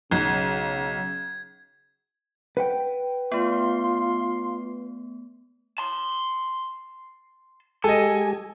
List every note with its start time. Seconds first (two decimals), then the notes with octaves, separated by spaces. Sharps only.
0.11 B1 C#3 G#6
2.57 B4 F#5 G5
3.32 A3 B3 F4 C6
5.78 A5 C6
7.84 G#3 G4 A4 D#5 G#5